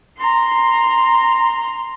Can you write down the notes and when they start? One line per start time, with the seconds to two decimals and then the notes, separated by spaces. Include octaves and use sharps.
0.17 A#5 C6